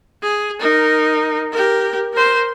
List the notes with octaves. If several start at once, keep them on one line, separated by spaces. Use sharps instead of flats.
G#4
D#4 A#4
G4 A#4
A#4 C5